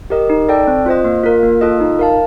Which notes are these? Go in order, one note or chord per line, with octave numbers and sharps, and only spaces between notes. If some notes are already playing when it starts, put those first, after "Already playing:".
G4 A#4 D#5
D#4
A4 D5 G5
C4
F4 C5 D#5
A#3
F4 A#4
A#3
F4 A4 D#5
D#4
A#4 F5 A5